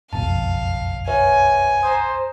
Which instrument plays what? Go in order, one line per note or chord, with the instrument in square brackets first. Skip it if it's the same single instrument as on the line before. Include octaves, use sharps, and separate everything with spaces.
[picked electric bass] F#1 B1 F2 [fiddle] F5 [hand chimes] A5
[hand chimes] B4 C#5 E5 [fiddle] G#5
[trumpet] C5 [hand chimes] A#5 D#6